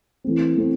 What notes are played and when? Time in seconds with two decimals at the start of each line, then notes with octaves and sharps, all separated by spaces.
0.24 E3 A3 C4
0.56 E3 A3 C4